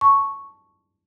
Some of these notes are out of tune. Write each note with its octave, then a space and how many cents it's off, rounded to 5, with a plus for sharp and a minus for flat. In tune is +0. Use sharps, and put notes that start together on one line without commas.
A5 +0 C#6 +0